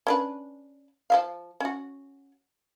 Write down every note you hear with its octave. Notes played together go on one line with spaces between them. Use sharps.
C#4 D4 B4
F3 E5 F5
C#4 F#4